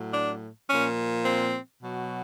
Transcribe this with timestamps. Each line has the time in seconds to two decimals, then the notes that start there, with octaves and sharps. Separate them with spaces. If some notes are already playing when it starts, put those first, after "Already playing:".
Already playing: A2 F#3
0.14 D4
0.70 A#2 F3 C#4
1.25 C4
1.81 B2 F#3